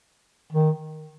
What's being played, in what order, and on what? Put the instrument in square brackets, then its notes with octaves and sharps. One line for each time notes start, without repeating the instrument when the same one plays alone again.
[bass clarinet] D#3